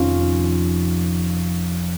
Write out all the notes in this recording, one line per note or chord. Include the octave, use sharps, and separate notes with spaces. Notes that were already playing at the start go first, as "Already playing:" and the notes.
Already playing: F1 F2 D#3 C#4 F4